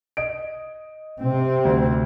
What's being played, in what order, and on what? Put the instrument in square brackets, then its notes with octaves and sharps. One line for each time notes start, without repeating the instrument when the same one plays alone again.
[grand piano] D#5 D7
[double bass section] C3 C4
[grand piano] D2